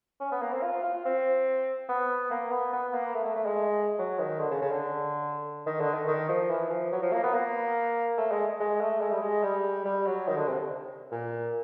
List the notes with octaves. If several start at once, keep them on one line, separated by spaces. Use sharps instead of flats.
C#4
B3
A#3
C4
F4
F4
C4
B3
A#3
B3
B3
A#3
A3
A3
A3
G#3
F#3
D#3
D3
C#3
C#3
D3
D#3
D3
D#3
D#3
F3
E3
F3
F#3
F3
A#3
B3
A#3
A3
G#3
G#3
A3
G#3
G3
G#3
G3
G3
F#3
D#3
D3
C3
A#2